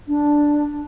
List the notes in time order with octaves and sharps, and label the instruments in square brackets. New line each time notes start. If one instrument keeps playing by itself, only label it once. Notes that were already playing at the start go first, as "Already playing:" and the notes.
[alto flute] D4